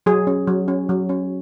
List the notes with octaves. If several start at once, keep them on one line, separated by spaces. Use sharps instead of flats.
F#3 G#4
C#4
F#3
C#4
F#3
C#4